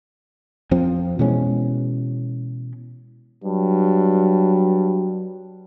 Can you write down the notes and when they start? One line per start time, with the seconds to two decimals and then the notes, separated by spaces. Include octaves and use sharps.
0.71 F2 F3 C4
1.19 B2 E3 G#3 C#4
3.44 G2 F#3